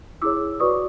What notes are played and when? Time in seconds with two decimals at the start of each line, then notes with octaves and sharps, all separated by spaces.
0.22 E4 G#4 C#5 D6 E6
0.60 F#4 B4 D5 C#6 D#6